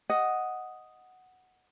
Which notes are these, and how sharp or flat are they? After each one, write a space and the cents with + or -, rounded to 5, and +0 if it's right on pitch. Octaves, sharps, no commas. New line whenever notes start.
D#5 +0 F#5 +0